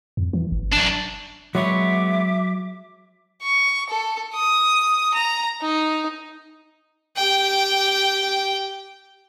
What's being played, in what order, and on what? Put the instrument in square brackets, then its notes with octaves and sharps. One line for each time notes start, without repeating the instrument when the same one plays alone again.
[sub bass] F2
E3
G1
[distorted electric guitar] F#2 D4
[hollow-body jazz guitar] F#3 [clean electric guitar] G#3 B3 C#5 [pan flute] E5 [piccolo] D6
[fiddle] C#6
A4
D#6
A#5
D#4
G4 G5